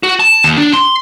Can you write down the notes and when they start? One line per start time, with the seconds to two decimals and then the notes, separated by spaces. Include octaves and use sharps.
0.03 F#4
0.20 A5
0.44 D#2
0.57 D4
0.73 C6